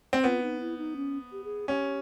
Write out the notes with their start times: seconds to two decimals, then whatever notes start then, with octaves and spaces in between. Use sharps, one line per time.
0.13 C4
0.24 B3 F4
0.42 D#4
0.60 E4
0.78 D#4
0.96 C#4
1.32 G4
1.44 G#4
1.68 C#4 G4